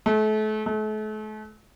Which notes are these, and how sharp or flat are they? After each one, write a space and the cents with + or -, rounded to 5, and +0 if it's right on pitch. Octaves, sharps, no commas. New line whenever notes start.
A3 -35
A3 -40